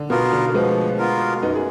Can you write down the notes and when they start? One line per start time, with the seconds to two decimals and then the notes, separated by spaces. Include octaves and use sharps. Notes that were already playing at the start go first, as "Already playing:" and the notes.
Already playing: D3
0.10 B2 B3 F4 A#4
0.33 D3
0.54 F3 G#3 B3
0.98 B3 F4 A#4
1.43 F#2 B3 D#4
1.55 G#4